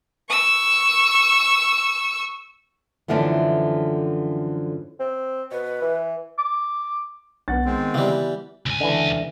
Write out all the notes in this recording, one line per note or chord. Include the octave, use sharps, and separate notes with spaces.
C#6 E6
F#2 D3 E3 F3 A3 B3
C4
B2 B4
E3
D6
B1 B3 F#5 A6
D#3 G#3 C4
C#3 E3 G3
C#2 G#5
D3 E3